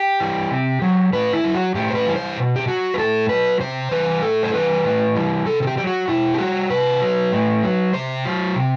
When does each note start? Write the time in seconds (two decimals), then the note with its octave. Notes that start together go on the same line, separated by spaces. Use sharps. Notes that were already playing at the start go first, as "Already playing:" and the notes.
Already playing: G4
0.20 E3 G3
0.51 C3
0.82 F#3
1.13 A2 B4
1.33 E4
1.44 F#3
1.54 F#4
1.75 A2 G4
1.90 C5
1.95 B4
2.06 E3 G3
2.16 C5
2.37 B2
2.56 G4
2.67 F#3 F#4
2.94 B4
2.98 A2 A4
3.29 F#3 B4
3.60 C3 C5
3.91 E3 G3 B4
4.22 A2 A4
4.43 C5
4.54 E3 G3 B4
4.84 A2
5.16 E3 G3
5.46 C3 A4
5.62 A4
5.67 G4
5.77 F#3 G4
5.87 F#4
6.08 B2 E4
6.34 G4
6.39 G3 F#4
6.70 C3 B4
7.02 F#3
7.32 A2
7.63 F#3
7.94 C3 C5
8.25 F#3
8.56 C3